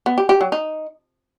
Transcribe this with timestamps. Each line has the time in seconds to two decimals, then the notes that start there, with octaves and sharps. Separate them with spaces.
0.06 B3
0.18 G4
0.29 G4
0.41 F#3
0.52 D#4